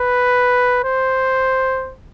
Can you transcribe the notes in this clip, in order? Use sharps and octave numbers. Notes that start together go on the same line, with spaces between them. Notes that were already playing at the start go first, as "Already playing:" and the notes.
Already playing: B4
C5